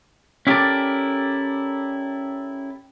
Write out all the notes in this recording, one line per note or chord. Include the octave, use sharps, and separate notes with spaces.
C#4 E4 G4 A4 A#4 D5